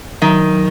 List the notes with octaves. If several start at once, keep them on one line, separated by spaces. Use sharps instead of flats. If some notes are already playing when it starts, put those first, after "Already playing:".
D#3 F#3